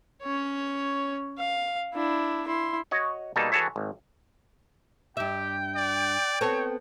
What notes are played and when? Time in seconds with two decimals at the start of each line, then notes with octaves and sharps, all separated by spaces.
0.23 C#4 C#5
1.38 F5
1.95 D4 E4
2.47 E4 C6
2.91 F#4 C#5 D#5 F#5
3.36 B2 G3 A#3 D#4 A4
3.52 E3 F#4 G#4 A4 C#5 E5
3.76 G#1
5.17 G2 G4 E5 G5
5.75 D5
6.41 B3 C4 A4 C#5